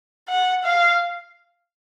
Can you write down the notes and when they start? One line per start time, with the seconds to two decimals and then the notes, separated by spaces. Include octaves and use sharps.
0.29 F#5
0.65 F5